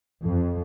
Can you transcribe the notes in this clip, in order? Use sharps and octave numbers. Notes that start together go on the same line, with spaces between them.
F2